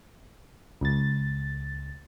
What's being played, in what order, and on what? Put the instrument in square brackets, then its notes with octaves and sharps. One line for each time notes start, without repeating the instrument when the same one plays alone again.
[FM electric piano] C#2 A6